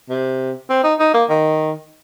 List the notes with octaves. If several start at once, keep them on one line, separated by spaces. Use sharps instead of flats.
C3
C4
D#4
D#4
A#3
D#3